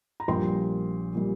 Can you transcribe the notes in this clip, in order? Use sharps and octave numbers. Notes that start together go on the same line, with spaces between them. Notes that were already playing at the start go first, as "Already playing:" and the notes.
A#5
A#1 A#2 G3 G5 C6
A#2 G3